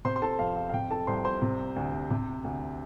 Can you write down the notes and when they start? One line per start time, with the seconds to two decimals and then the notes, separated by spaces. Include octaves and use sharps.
0.05 C3 C5 C6
0.16 C6
0.22 A4 A5
0.39 F2 F5
0.56 F5
0.69 F5
0.73 C3 G5
0.90 A4 A5
1.07 C2 C5 C6
1.25 C5 C6
1.42 C3
1.76 D2
2.10 C3
2.44 D2